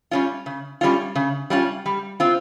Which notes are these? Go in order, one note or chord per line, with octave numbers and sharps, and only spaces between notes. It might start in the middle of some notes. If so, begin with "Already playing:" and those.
G3 C#4 F4
C#3
G3 C#4 F4
C#3
G3 C#4 F4
G3
C4 F4